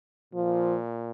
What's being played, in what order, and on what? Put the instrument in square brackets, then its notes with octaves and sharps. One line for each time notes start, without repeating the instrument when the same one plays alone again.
[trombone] A#2 [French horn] F3